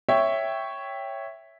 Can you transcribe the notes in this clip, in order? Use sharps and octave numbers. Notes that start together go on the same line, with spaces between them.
C#5 E5 G5